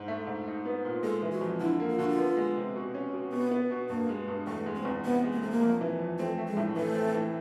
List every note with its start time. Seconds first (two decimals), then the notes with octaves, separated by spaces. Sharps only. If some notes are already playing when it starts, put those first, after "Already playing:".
Already playing: G#2
0.08 A3
0.27 G#2
0.47 D#4
0.65 B3
0.85 A#2
1.03 G#3 A4
1.22 E3
1.32 F#4
1.41 F2
1.60 D3 E4
1.80 A#3
1.90 F4
1.98 D3 F#4
2.09 F4
2.19 B3
2.37 G#3
2.56 C3
2.76 B2
2.94 C#4
3.13 B2
3.32 B2 B3
3.51 B3
3.71 B2
3.90 G2 A#3
4.09 G#3
4.28 G2
4.47 E2 A3
4.66 G#3
4.76 C4
4.85 E2
5.05 C3 B3
5.24 G#3
5.33 A#3
5.42 C3 A3
5.51 A#3
5.61 F2
5.81 E3
5.99 F2
6.18 A3 C4
6.38 A3
6.48 G#3
6.57 A2
6.76 E3 A3
6.95 C4
7.15 E3